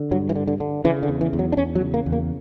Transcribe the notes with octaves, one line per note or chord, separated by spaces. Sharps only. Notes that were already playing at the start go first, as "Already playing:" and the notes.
Already playing: D3
G2 F#3
E3
D3
D3
D3
C#3 E3
D3
E2
E3
E2
F#3
D4
E2 C#4
F#3
C#3
A#3
E2
A#3